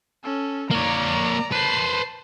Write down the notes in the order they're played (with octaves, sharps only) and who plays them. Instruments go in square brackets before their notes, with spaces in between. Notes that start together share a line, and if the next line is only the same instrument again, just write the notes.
[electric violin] C#4 A4
[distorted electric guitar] A#3 C#5 [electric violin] D5 A#5
[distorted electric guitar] B4 C5 [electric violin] A5 C7